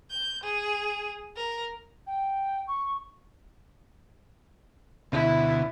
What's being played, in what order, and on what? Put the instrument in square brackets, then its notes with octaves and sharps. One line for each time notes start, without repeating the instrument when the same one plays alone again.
[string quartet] G6
G#4
A#4
[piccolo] G5
C#6
[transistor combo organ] D2 B2 [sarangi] E4